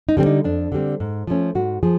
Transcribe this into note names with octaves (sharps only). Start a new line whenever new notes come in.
D#4
D3 G3 C4
D#4
F2 D4
D3 G3 C4
G#2
F3 A3 C#4
G#2 F#4
F3 G#4